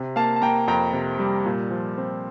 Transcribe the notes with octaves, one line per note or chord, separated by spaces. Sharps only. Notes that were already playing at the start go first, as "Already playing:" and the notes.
Already playing: C3
A#3 F5 A5
A5
A#3 G5 A#5
F2 G5 A#5
C3
G3
A#2
F3
C4